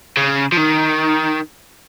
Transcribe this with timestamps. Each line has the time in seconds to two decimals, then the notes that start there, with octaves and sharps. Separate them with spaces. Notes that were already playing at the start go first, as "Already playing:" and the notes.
0.17 C#3
0.52 F3
0.57 D#3